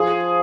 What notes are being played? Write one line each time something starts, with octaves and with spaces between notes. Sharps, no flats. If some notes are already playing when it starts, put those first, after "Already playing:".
Already playing: F3 G#4